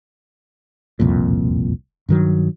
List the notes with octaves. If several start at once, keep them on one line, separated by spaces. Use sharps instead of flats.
E1 C2 F2 A#2
G2 D#3 F#3